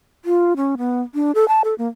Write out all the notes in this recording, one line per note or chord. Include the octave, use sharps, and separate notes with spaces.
F4
C#4
B3
D4
A4
A5
A4
A#3